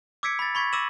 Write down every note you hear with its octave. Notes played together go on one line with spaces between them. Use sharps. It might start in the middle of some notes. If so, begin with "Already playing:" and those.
D6 E6 G#6 B6 C#7 D7
B5 A6
B5 C#6 G#6 A6 B6
D6 E6 A#6 D#7 E7 F#7